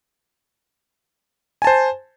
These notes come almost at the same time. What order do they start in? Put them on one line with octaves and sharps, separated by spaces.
G#5 A5 C5